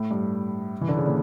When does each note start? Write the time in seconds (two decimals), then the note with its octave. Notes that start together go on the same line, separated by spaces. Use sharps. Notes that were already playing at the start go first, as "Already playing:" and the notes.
Already playing: A2
0.11 G2
0.81 E3
0.88 D3
0.97 C#3
1.06 A#2